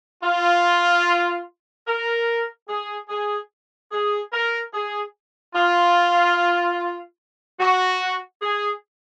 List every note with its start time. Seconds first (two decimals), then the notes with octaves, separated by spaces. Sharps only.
0.23 F4
1.87 A#4
2.68 G#4
3.09 G#4
3.92 G#4
4.33 A#4
4.73 G#4
5.55 F4
7.60 F#4
8.42 G#4